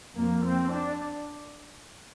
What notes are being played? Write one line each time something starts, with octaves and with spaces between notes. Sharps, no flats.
F2 F3 A#3
C4
D4